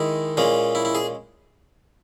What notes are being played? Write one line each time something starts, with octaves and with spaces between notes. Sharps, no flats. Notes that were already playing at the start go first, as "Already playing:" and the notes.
Already playing: D#3 G#3 D#4 E4
A#2 G#3 C#4
E4
E4
G#4